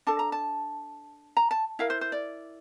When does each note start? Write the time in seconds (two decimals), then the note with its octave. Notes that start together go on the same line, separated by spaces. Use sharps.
0.07 D4 A4 A5
0.19 A#5
0.32 A5
1.37 A#5
1.51 A5
1.79 E4 A#4 F5
1.90 C5
2.01 C5
2.12 D5